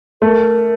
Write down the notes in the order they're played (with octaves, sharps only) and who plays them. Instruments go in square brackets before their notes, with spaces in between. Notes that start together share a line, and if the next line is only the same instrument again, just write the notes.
[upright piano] A3 [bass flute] A#4